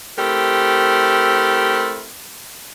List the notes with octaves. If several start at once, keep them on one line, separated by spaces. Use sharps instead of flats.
A3 C4 E4 G4 A#4